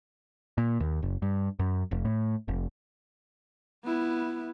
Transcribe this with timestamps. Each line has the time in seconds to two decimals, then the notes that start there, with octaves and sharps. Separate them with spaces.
0.58 A#2
0.80 D#2
1.02 F#1
1.22 G2
1.59 F#2
1.91 F1
2.05 A2
2.48 F1
3.85 B3 E4